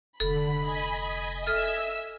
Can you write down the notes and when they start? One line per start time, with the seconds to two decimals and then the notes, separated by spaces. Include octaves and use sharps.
0.20 F1 D3 A4 B5
0.59 D#5 G#5 B6
1.46 A4 E5 E6 F6